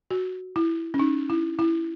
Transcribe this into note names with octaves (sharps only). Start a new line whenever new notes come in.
F#4
E4
C#4
D#4
E4
E4